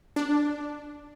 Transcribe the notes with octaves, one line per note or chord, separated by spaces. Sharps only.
D4